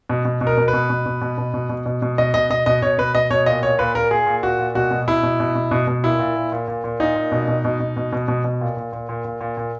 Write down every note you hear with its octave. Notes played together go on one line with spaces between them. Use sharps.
B2
B2
B2
A#4
B2
B4
B2
B2
B2
B2
B2
B2
B2
B2
B2
B2 D#5
B2 D#5
B2 D#5
B2 D#5
B2 C#5
B2 B4
B2 D#5
B2 C#5
A#2 D#5
A#2 C#5
A#2 B4
A#2 A#4
A#2 G#4
A#2
A#2 F#4
A#2
B2 F#4
B2
B2 E4
B2
B2
B2
B2
B2
A#2 E4
A#2
A#2
A#2
A#2
A#2
A#2 D#4
A#2
B2
B2
B2
B2
B2
B2
B2
B2
A#2
A#2
A#2
A#2
A#2
A#2
A#2